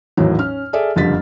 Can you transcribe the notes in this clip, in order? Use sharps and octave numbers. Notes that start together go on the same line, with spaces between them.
G#1 E2 A2 D#3 F#3
C#4 F6
G#4 A4 D5 E5
F#1 F2 D3 G3 A6 B6